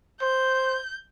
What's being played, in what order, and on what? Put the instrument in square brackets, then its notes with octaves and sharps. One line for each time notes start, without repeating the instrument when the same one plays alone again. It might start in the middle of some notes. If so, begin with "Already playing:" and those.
[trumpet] C5 [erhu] G6